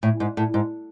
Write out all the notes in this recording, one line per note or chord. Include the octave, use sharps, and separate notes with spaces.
A2
G#2
A2
G#2